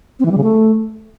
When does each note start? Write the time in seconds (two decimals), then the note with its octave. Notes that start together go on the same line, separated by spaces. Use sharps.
0.19 C4
0.25 E3
0.31 G3
0.37 C#3
0.43 A3